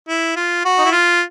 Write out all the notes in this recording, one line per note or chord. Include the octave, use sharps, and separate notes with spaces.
E4
F4
F#4
D#4
E4
F4